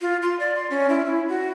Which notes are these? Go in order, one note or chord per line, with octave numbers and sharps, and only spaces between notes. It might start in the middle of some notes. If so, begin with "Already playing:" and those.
F4
C6
D5
C6
C#4
E4
E4
F#4